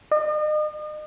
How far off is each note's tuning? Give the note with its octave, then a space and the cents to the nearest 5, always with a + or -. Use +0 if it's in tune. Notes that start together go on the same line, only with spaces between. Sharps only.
D#5 -40